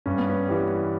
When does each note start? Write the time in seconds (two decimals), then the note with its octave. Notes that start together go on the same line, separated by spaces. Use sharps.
0.06 G2 C#4
0.18 B3
0.30 C#4
0.48 E3 G3